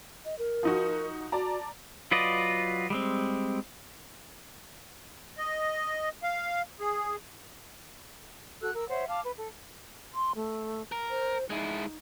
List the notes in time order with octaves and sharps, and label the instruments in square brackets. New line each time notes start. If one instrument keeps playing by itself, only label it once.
[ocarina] D#5
A#4
[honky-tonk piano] F3 D#4 F#4
[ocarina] F#4 [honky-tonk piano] D5 A5 A#5
[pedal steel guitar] F#3 F4 B4 D5 D#5
G3 G#3 C4
[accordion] D#5
F5
G#4
[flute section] F#4 A4 E6 F#6
A#4 E6
C5 C#5 E5 F#5
F5 A5 D6 F6
B4
A4
[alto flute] C6
A3
[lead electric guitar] A#4
[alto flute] C5
[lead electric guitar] G#3 E4 [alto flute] D#4